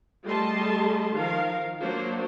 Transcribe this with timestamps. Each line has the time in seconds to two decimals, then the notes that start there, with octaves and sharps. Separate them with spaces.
0.25 G3 A3 G#4 D#5 A5 C6
1.14 D#3 F3 A#4 F5
1.82 F#3 A#3 D4 C5 C#5